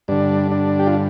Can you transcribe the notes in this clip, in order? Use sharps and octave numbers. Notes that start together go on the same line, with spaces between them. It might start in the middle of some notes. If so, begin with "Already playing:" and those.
G2 D3 D4
D4
G4
F4